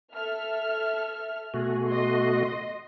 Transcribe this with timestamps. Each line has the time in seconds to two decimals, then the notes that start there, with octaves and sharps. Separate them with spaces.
0.14 A4 E5 F6
1.54 B2 A3 F#4 G#4
1.89 D#5 C6